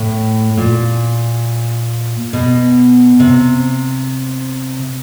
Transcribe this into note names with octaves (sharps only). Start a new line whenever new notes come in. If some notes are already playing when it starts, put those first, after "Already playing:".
Already playing: A2
A#2
B2
C3